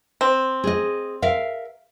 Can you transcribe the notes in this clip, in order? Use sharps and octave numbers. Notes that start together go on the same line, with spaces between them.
C4
G#4 D#5
A#4 E5 F5